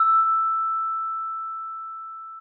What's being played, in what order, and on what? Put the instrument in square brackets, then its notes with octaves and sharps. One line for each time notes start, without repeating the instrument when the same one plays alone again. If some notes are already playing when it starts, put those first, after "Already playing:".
Already playing: [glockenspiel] E6